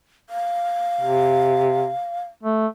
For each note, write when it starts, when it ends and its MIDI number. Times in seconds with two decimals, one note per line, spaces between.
0.30 2.23 77
1.01 1.91 48
2.43 2.67 57